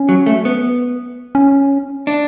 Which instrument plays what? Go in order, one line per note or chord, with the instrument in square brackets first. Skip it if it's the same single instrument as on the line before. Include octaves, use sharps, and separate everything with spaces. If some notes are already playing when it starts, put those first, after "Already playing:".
Already playing: [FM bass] C#4
[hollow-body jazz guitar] F#3
A3
B3
[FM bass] C#4
[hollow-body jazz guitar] D4